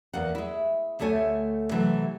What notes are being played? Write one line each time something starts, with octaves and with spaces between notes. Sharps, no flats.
E2 A#3 F#5
G#3 E4
D2 A3 A4 C#5 G#5
C3 E3 F#3 A3